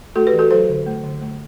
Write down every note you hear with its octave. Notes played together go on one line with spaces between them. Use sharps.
A3 F#4 A4
G4 B4
E3
F#4 A4
F#3 A4 C5
D3
A3
D3
A3